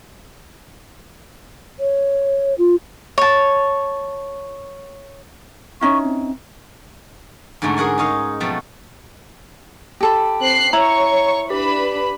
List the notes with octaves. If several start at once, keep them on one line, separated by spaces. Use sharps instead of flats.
C#5
F4
C#5 A5
C#4 D#4 E4 C#6
C4
G#2 D3 F#3 A3 C#4
G#4 A#4 F#5 G#5
D#4 G#4 C#5 D#5 F5
B2 F3 F#3 A3 C4
G4 A4 B5
C4 F#6 C7
E4 C#5 A#5 C#6
D4 G4 B4 B5